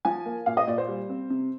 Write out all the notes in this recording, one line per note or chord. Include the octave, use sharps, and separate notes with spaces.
F3 G#5
A#3
A#2 F5
D#5
A#2 D5
C5
G3
C4
C3